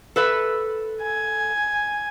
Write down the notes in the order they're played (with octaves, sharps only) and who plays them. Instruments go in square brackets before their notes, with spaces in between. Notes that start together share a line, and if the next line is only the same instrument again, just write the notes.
[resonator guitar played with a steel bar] A4 B4 E5
[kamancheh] G#5